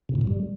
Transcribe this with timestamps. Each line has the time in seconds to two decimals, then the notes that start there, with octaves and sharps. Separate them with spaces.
0.09 C3
0.15 A#2
0.21 G2
0.27 G3